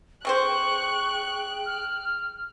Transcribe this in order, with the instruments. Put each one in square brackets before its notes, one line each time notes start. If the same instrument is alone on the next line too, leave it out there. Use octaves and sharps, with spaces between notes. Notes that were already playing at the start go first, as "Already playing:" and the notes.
[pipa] D3 C4 C5 [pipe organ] G#4 G5 [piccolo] C#6 [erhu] F#6
[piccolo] F6